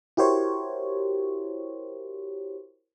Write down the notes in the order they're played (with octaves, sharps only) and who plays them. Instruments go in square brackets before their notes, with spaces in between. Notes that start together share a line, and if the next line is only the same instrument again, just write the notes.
[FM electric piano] E4 F#4 G4 A#4 C5 C#5